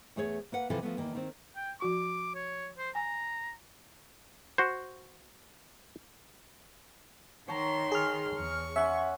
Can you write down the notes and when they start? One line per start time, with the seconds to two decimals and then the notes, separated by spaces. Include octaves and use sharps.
0.16 E2 A3 G#4 C#5
0.52 A#3 B4 F#5
0.70 C3 E3 F3 A4
0.83 F3 A3 B3
0.97 E2 D#3 A#3
1.15 D#3 C4
1.56 G5
1.80 F3 F#4 C#6 D6
2.35 C#5
2.78 C5
2.95 G#5 A#5
4.58 F#4 C5
7.48 D#3 C#5 A5 A#5 C6
7.92 G#4 F6
8.37 E2 C#6
8.76 C#4 E5 F#5 C6